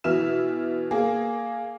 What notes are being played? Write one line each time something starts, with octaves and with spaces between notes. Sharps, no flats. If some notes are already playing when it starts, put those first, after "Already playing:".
B2 E3 E5 F6 E7
A#3 G#4